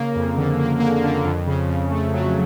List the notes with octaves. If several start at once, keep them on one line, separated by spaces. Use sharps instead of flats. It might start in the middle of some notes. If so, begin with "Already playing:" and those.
Already playing: C#3 A#3
F2
D3
A#3
A#3
D3
F2
C#3
F2
A3
F#3